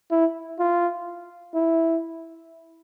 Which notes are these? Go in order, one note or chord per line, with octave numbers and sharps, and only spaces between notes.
E4
F4
E4